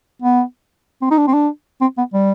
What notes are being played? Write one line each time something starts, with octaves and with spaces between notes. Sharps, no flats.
B3
C4
D#4
D4
C4
D4
C4
B3
G3